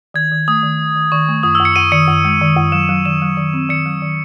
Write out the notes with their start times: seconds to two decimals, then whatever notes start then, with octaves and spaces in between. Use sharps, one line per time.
0.14 D#3 G#6
0.32 D#3
0.48 A3 D#6
0.63 D#3
0.79 D#3
0.95 D#3
1.12 D#3 C#6
1.28 A3
1.43 F#2 D#6
1.55 E6
1.60 F#2
1.65 C#7
1.76 F#2 D#7
1.92 D#3 C#7
2.08 F#2
2.24 G#3
2.41 D#3
2.56 F#2
2.72 F#3 E7
2.89 F#3
3.05 D#3 E7
3.22 F#3
3.37 D#3
3.53 C4
3.69 D#3 C#7
3.86 F#3
4.02 D#3